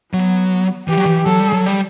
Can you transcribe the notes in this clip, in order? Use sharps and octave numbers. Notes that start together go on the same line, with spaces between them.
F#3 B3
E3 G4
F#3
E3
F#3 A4
G3
F#3
G3